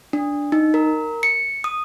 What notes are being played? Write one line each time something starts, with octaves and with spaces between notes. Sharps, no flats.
D4
D#4
A#4
C#7
D#6